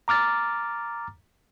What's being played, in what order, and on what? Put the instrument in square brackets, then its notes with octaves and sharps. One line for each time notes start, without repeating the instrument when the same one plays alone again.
[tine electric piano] A#5 D6 F6 A6